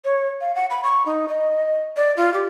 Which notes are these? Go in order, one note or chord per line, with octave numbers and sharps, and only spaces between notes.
C#5
F5
F#5
B5
C#6
D#4
D#5
D5
F4
G4